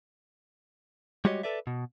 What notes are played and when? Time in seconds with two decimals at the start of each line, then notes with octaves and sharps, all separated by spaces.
1.25 G3 G#3 F#4 G4 C#5 D#5
1.43 A4 B4 D5 E5
1.67 B2